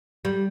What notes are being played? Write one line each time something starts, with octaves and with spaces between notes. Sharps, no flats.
G3